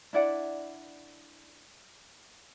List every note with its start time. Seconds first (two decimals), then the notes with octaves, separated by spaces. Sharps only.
0.13 D4 E4 D5 F#5